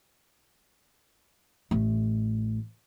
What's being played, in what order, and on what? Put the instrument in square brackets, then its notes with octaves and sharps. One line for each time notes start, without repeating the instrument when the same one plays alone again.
[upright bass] A1 A3